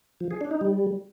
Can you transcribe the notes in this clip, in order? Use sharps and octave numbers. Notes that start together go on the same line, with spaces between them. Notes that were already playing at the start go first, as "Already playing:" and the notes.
F3
G#4
D4
D#4
G3